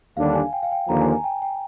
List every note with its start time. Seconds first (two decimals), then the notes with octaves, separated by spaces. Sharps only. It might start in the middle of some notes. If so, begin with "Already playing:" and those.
0.17 D#2 D3 G3 D4 F5
0.35 G#5
0.53 G5
0.63 F5
0.72 G5
0.88 D#2 D3 F3 A#3 A#5
1.01 G#5
1.12 G#5
1.24 G5
1.42 G5